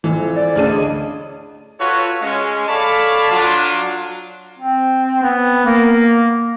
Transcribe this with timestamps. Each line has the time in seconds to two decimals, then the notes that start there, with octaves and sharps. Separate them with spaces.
0.04 F2 E3
0.36 D5
0.56 D2 C#3 D4 D#7
0.69 G#3 G#4
1.79 F4 F#4 A4 B4 C#5
2.21 G#3 C#4
2.67 A4 C#5 D5 F5 A5 B5
3.31 F#3 D4 F4
4.60 C4
5.23 B3
5.66 A#3